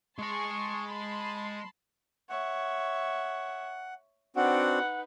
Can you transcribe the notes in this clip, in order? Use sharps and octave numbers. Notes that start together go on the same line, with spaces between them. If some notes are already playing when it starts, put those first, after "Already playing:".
G#3 G#5 A5 C6 C#6
A5 B5 C6
C#5 E5 F#5
C4 D4 D#4 F#4 B4 F#5